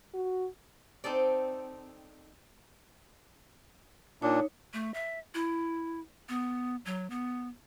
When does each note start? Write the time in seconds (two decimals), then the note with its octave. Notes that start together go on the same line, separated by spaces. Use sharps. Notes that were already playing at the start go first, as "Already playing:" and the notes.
0.14 F#4
1.04 C4 D#4 A4 D5
4.22 A#2 D4 D#4 C#5
4.73 A3
4.94 E5
5.34 E4
6.29 B3
6.85 F#3
7.10 B3